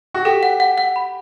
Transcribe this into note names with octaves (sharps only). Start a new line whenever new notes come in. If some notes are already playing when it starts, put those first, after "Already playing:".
F#4
G4 A4
F#5
F#5
F#5
B5